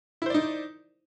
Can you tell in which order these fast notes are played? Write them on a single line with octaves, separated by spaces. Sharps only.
E4 C5 D5 D#4